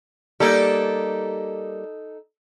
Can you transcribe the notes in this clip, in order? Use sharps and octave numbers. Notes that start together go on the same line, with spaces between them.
G3 A#3 D#4 A4